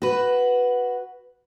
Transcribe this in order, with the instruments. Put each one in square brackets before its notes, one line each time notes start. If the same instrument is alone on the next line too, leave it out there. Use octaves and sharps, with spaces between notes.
[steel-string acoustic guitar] F#4 B4